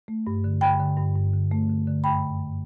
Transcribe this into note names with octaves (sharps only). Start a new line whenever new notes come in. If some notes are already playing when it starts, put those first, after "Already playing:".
A3
G2
D3
D3 G5 B5
D3
G2
G2
D3
A3
D3
D3
F#2 G5 B5
F#2
F#2